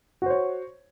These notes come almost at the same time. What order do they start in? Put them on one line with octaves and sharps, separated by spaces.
F#4 C5 C#5